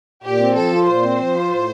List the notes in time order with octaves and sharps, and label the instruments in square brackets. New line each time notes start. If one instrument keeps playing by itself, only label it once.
[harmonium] A#2 [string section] G4
[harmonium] C4
[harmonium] F3 [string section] A4
[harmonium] F4
[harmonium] A#2 [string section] C5
[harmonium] C4
F3
F4
A2